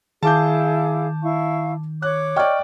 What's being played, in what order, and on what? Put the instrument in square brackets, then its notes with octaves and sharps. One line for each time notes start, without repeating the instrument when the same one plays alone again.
[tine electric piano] D#3 [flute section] E4 G#4 F5 [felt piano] A5 D6 G6
[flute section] E4 F5 C#6
[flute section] C#5 D6 [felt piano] F#6
[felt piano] D5 G5 [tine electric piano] D#5 C#6 F6